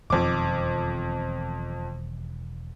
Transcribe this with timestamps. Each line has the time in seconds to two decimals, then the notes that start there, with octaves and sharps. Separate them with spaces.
0.10 E1 F2 D#3 D6